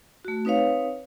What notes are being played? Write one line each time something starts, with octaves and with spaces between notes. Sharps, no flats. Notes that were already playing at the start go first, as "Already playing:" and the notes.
A3 F#4
C4 D#4 B4 C#5 F5